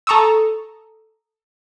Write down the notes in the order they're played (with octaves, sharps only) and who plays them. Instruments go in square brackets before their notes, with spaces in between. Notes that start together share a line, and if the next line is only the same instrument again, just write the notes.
[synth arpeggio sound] A4 A#5 C#6 D#6 E6